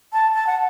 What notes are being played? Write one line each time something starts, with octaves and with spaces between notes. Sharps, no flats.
A5
A5
F#5